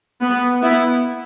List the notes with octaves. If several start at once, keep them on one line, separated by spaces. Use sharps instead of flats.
B3
B3 E4